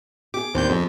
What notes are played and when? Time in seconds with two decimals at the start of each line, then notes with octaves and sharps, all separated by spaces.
0.34 G4 G#4 D6
0.54 D#2 C4 D4 G6
0.70 F2 G#4